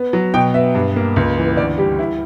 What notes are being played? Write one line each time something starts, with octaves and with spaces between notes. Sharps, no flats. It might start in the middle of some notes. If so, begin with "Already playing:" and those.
Already playing: B3
F#3
B2 G5
B3 E5
G2
A#3
C#2
E3
D2 D5
G3 G4
E4